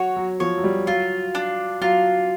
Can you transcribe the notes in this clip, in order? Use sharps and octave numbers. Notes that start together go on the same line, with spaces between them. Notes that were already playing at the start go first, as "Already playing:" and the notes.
Already playing: F#3 F#4 C#5
F#3
F3 C#5
F#3
G3
F#3 F4
D4
F#3 F4